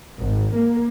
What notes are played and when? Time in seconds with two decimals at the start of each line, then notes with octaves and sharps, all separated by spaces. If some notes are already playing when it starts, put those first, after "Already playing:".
0.18 G#1
0.54 A#3